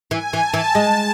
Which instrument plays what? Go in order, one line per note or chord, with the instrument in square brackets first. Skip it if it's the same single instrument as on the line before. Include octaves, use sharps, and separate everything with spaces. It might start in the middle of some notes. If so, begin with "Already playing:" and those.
[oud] E3 [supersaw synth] G#5
[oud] E3
[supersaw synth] A5
[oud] E3
G#3